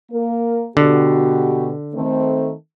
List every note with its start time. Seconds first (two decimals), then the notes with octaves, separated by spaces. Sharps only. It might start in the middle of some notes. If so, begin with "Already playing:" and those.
0.11 A#3 A#4
0.77 B2 D3 F#4 G4
1.94 D#3 A3 C4